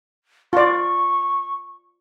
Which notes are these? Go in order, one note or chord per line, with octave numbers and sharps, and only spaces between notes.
F4 D5 C#6